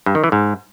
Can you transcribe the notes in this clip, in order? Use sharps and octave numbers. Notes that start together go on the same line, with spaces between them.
G2
D#3
E3
G#2